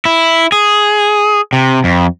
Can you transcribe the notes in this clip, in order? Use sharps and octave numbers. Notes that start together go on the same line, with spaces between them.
E4
G#4
C3
F2